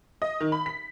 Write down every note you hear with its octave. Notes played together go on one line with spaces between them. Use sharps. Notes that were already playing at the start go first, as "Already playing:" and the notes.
D#5
D#3
B5
B6